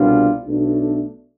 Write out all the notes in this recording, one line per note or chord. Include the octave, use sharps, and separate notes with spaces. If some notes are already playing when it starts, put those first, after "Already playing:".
Already playing: C2 B2 G3 D4 F4
B1 B2 A3 D4